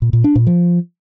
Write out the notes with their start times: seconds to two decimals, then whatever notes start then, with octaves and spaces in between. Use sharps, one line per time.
0.02 A#2
0.13 A#2
0.24 D4
0.35 A#2
0.47 F3